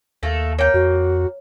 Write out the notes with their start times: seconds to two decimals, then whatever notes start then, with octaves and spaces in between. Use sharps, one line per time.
0.23 D#2 A3 A#3 A4
0.59 A#3 C#5 G5
0.74 F2 F#4